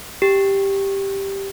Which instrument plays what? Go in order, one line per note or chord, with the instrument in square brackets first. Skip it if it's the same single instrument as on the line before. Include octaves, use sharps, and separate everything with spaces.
[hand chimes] G4